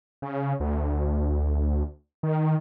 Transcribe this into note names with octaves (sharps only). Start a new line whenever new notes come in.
C#3
D2
D#3